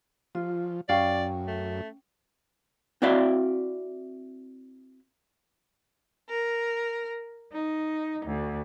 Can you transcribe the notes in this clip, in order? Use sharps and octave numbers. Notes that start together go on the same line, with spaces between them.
F3 F4
F#2 C#4 D5 F5 G5
A3
C4 E4 F#4 D5 E5 F5
A#4
D#4
D2